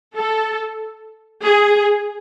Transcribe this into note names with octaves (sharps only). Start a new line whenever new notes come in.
A4
G#4